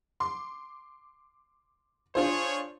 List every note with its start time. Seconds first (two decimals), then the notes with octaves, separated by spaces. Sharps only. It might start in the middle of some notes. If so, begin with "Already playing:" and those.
0.20 C6 D6
2.15 D4 F4 G#4 C5 C#5